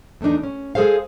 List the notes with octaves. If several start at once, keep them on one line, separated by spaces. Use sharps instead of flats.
E2 A3 C4 D4 D#4
C#4
G#3 G#4 A4 C5 F5